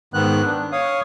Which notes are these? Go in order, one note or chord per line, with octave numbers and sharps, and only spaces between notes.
G#2 D#3 B3 F#6
D4
C#5 F5 D#6